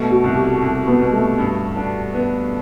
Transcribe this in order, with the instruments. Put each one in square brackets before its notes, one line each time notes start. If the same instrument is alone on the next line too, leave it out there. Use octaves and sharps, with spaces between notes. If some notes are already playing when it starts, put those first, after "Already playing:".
Already playing: [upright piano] B2 [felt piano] A3
[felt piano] F#4
[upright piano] C2
[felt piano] G4
[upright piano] C2
[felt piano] B3
[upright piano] B2
[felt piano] A3
[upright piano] G2
D4
B3